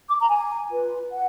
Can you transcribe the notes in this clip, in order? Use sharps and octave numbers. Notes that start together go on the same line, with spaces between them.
D6
A#5
G#5
F4 B4
F#5